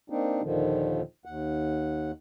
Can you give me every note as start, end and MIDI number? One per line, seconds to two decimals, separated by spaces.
0.10 0.42 58
0.10 0.42 60
0.10 0.42 62
0.10 0.42 63
0.42 1.01 39
0.42 1.01 46
0.42 1.01 50
0.42 1.01 51
0.42 1.01 53
1.25 2.12 39
1.25 2.12 78